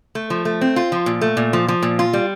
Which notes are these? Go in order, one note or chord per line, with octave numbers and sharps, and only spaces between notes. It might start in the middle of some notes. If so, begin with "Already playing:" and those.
A3
F3
A3
C4
F4
F3
A#2
A3
A#2
F3
F3
A#2
F4
G3